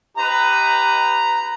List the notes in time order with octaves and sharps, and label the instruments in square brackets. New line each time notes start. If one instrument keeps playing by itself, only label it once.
[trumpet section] D#4 G4 B4 [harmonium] A#5